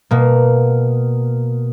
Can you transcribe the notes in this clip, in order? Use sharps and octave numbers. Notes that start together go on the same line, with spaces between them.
B2 A#3